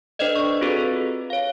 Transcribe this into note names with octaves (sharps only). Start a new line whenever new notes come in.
D4 A4 B4 C5 D5 D#5
C#6
C4 F4 F#4 G#4 A4 B4
C#5 F5